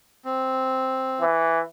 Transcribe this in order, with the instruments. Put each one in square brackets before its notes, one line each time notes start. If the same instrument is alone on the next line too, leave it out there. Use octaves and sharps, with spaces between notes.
[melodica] C4
[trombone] E3